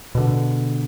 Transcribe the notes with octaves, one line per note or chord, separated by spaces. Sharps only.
B2 D3